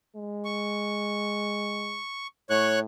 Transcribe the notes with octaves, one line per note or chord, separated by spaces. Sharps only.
G#3
C#6
A2 C#5 C#6 F#6